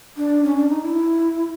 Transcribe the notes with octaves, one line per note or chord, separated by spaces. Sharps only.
D4
C#4
D4
D#4
E4